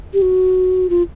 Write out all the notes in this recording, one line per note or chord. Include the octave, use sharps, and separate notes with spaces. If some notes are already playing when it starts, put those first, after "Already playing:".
G4
F#4
F4